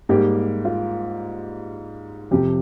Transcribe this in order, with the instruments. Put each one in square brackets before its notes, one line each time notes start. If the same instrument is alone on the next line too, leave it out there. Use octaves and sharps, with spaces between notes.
[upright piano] G#2 G3 A#3 G4
F4
F2 C3 F3 G4